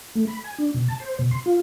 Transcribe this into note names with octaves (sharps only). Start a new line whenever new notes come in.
A3
B5
G#5
D4
B2
A5
C5
B2
C6
F4